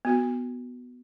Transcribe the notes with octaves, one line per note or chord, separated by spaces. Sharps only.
B3 F#4